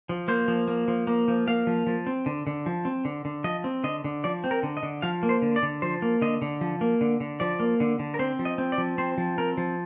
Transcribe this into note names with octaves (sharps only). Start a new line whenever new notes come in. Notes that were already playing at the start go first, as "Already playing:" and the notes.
F3
A#3 C5
F3
A#3
F3
A#3
F3
A#3 F5
F3
F3
C4
D3
D3
F3
C4
D3
D3
F3 D#5
C4
D3 D#5
D3
F3 D5
C4
A#4
D3
D#5
D3
F3 F5
A#3
C5
D3
D5
D3
F3 C5
A#3
D3 D#5
D3
F3
A#3
D3
D3
F3 D5
A#3
D3
D3
A#4
C4 C5
F3
D#5
C4
D5
F3
C4 C5
F3
C4 A#4
F3